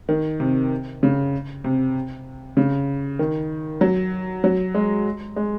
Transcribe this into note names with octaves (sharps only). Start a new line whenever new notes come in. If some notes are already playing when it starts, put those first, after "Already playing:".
D#3
C3
C#3
C3
C#3
D#3
F#3
F#3
G#3
G#3